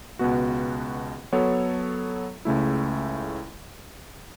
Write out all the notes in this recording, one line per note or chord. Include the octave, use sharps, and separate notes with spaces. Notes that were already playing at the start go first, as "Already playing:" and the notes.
C#2 B2 B3 F#4
F#3 B3 A4 C#5
C#2 C#3 A3 E4